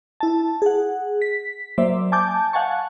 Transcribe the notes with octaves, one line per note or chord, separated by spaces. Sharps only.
E4 A5
G#4 F#5
B6
F#3 A#3 C5 D5 E5
G#5 A5 D6 G6
F5 F#5 G#5 A5 C#6